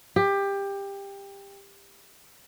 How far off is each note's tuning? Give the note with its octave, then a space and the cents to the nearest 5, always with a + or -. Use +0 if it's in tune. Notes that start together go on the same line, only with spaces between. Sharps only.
G4 +20